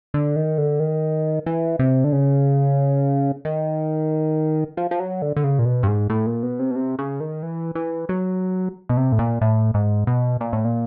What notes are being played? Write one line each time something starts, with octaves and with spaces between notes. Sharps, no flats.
D3
D#3
D3
D#3
E3
C3
D3
C#3
D#3
F3
F3
F#3
D3
D3
C#3
A#2
B2
G2
G#2
A2
A#2
B2
C3
B2
C3
C#3
D#3
E3
E3
F#3
B2
C3
A2
A#2
A2
G#2
B2
A#2
A2
A#2